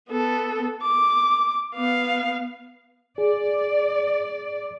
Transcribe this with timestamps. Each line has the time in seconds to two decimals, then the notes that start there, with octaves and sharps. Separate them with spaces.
0.10 B3 A4
0.83 D6
1.75 B3 F5
3.18 G#4 D5